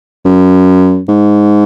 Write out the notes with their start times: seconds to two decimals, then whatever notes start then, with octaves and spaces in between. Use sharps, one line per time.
0.25 F#2
1.09 G#2